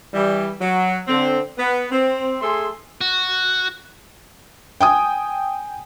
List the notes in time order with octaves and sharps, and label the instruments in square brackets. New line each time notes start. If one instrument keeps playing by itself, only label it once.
[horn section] E3 G3
F#3
D3 C4
B3
C4
A3 G#4 A4 C6
[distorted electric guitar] F#4
[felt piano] G5 G#5 D#6